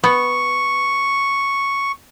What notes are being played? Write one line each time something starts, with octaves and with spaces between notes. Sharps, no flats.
B3 C#6